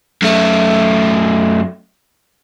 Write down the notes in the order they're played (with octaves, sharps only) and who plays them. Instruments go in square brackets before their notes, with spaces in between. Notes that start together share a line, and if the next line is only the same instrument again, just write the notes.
[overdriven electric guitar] F#2 A3